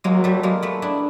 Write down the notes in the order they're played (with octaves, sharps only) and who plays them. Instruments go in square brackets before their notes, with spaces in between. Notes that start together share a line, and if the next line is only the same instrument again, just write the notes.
[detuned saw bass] F#3 [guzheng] G#3 A#3
[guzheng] G3 A3
G#3 A#3
A3 B3
D4 E4